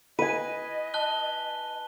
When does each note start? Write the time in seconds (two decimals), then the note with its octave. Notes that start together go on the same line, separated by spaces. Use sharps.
0.19 B4 D#5 G#5 D#7
0.94 A5 F#6 G7